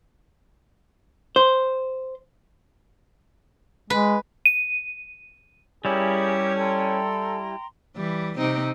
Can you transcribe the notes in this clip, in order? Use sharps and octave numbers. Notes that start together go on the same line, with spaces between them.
C5
G#3 B4
D#7
G3 C#4 E4 G4 G#4 A#4
A4 G5 A#5 C6
E3 G3
C3 C4 D#4